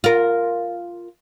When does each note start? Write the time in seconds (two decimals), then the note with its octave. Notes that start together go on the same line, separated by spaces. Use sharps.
0.04 F4 A#4